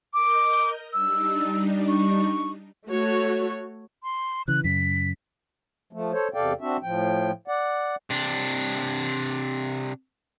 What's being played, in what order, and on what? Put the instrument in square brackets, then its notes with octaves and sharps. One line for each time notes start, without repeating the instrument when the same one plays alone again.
[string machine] A#4 D#5 G6 [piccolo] D6
[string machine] G3 D4 D#4 [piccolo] E6
[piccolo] C#6
[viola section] A3 F#4 C#5
[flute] C6
[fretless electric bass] C#3 E3 [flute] F#6
[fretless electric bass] F#2 C#3 [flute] B6
[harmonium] F3 A3
A4 C5 C#5
E2 C3 A4 D5 F5 G5
C4 D4 F#4 E5
A2 F3 G5
D5 F#5
[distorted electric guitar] C3 D4